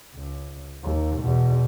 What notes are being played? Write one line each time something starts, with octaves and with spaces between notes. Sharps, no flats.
C#2
D#2
E2 B2